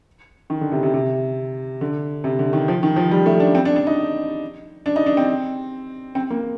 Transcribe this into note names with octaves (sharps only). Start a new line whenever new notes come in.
D#3
D3
C3
C3
C3
D3
C3
D3
D#3
F3
D#3
F3
G3
A3
D4
C4
D4
D4
D#4
D4
D#4
D4
C4
C4
A#3